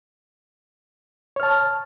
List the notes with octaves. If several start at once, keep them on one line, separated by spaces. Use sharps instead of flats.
C#5 A5 F6